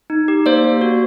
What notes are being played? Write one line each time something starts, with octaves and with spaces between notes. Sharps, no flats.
D#4
G4
A#3 C5 D5
A#3
F#4